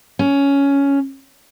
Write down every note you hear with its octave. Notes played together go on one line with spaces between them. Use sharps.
C#4